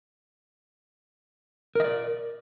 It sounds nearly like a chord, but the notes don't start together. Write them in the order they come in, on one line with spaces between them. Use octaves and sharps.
A#4 D#5 D5